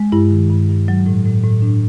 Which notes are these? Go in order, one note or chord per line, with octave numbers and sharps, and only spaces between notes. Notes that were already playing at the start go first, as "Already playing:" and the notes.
Already playing: G#3
G2 E4
D#3
G2
G2
F#3
A2
A2
A2
A2 D4